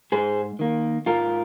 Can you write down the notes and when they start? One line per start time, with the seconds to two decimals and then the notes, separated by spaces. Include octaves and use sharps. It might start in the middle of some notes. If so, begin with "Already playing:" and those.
0.12 G#2 G#4 C5
0.59 D#3 A#3
1.06 G#2 F4 A#4